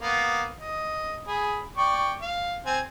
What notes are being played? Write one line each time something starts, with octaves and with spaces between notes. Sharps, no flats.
A#3 B3
D#5
G#4 B5
D5 G5 C#6
F5
C4 G#5